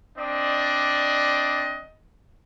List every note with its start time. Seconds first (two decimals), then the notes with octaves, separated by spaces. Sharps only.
0.17 C4 D4 D5 D#5